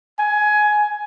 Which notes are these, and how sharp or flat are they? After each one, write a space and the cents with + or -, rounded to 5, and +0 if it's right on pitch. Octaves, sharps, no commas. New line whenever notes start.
G#5 +15